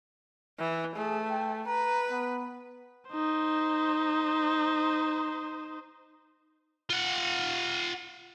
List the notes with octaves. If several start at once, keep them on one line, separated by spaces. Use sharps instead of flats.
E3
A3 G#4
G5
B4 A#5
B3
D#4 C5
F4 F#5